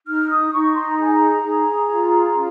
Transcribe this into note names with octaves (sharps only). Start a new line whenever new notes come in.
D#4 F6
D#6
D#4 C#6
C6
A#5
G#4 G#5
A#5
G#4
F4
C#4